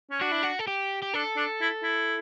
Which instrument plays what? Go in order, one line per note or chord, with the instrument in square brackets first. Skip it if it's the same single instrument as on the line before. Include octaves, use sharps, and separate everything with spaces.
[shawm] C#4
[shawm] D4 [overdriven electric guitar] F#4
[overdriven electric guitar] E4
F#4
A4
G4
G4
[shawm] D4 [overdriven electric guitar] A4
[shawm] D4
E4
E4